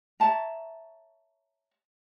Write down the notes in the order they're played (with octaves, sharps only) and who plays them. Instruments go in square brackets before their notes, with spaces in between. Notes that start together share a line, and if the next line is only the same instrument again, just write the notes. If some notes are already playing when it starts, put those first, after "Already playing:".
[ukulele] C#5 E5 A5 A#5